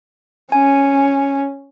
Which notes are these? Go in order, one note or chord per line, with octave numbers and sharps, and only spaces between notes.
C#4 G#5